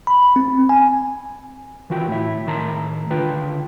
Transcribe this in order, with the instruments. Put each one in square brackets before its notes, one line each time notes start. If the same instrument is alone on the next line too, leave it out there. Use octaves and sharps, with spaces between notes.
[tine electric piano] B5
C4
G#5
[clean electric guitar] D#3 E3 F4 F#4 G5
A2 E4
A2 D#3 A5 A#5 C6
C#2 D3 F4 B4 G5